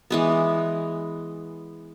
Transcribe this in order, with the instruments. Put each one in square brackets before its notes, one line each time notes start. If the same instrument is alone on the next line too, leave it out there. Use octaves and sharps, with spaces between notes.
[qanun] E3 G#3 B3